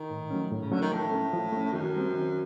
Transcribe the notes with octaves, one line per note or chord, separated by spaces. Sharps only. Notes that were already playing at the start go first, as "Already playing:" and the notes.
Already playing: D#3
A2
F#3 A3 C#4
A2
C#3
D3 F#3 A3 C#4
D#3
A2 F3
A3 C#4
F3
A3 C#4
F#2 D#3
G3 C4
D#3